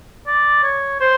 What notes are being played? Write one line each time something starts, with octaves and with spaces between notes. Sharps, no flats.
D5
C#5
C5